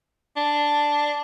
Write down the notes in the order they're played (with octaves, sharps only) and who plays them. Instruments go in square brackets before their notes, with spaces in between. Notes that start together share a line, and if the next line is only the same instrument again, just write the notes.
[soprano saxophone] D4